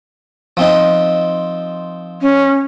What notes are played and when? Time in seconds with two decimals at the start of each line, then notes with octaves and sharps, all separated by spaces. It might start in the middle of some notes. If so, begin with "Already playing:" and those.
0.57 F3 C4 D#4
2.22 C#4